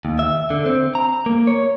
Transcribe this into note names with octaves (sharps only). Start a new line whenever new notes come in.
D#2
E5
D3
C4
A#5
A#3
C#5